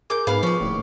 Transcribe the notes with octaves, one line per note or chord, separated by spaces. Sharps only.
G#4 A#4 D6 G6
G#2 B3 G#4 B4 F5 B5 F6
F3 C#4 D5
D#1 A2